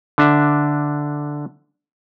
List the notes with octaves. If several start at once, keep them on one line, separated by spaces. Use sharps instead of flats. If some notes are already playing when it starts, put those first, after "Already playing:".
D3 D4 E5